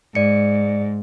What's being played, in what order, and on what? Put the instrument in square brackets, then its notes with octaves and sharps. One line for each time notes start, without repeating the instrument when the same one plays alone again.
[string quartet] G#2 [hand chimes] D5 C#7